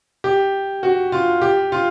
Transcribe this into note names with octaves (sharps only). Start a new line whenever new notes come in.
G4
F#4
F4
G4
F4